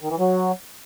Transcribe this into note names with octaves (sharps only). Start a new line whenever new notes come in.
D#3
E3
F#3